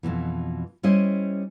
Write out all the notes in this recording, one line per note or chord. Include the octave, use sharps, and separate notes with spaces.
F2 G#2 B2 E3
G3 C#4 E4 C5 D#5